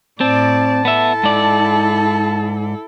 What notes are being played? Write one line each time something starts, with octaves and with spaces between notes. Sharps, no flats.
A2 C4 D5 A5
B3 E4 A4 E5
G#2 D5